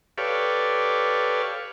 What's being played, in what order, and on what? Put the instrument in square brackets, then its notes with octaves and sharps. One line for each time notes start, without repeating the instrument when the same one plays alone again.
[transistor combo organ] G4 A4 B4 C#5 D5 F5